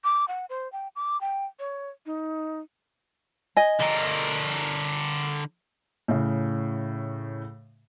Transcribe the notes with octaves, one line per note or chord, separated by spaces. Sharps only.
D6
F#5
C5
G5
D6
G5
C#5
D#4
D#5 G#5
D3 A#4
A2 C#3